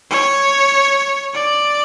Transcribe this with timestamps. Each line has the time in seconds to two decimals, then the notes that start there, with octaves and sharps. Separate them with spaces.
0.11 C#5
1.34 D5